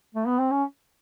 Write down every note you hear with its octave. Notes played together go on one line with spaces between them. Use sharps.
A3
B3
C4
C#4